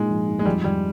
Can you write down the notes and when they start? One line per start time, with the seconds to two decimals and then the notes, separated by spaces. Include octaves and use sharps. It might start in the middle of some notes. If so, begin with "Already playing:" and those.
Already playing: A#2 G#3 D#4
0.10 F3
0.28 D#4
0.39 G#3
0.45 F2 G3
0.64 F2 G3